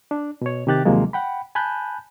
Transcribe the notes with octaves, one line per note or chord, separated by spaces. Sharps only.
D4
B2 C#5
C3 D#3 G4 F#6 A6
D#2 C3 F3 F#3 G#3 A#3
F#5 G5 B5
G#5 A5 B5 F#6 G6